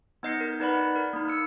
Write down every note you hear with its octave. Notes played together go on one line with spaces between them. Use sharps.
B3 D#4 D#5 G6 C7 C#7
A#4
D#4 B4 D5 F#5 B5
A#4
A#3 D#4
E6 C#7